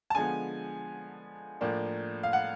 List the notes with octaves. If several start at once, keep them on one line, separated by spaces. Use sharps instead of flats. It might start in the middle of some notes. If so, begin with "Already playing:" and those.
A5
D3 F3 G#3 B3 G#5
A2 F3 A#3 D4
F5
F#5